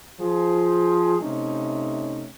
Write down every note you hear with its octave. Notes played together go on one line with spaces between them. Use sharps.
F3 G#4
C3 A3 C#4 D#4